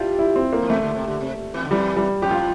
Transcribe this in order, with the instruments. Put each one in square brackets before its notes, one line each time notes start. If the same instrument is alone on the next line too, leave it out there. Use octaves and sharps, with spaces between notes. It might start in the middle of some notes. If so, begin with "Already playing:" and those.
Already playing: [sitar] G2 G3 [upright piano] E4 F4
[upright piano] E4
C4
A#3
[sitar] F3
[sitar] E2 E3 [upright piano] A3
[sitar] C3
D3
C3
D3
C3
E2 E3
D3
[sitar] E2 E3 [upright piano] G3
[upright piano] G3
[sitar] F2 F3 [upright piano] G4
[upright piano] F4